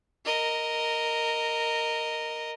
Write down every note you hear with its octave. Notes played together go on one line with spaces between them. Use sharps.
A#4 D#5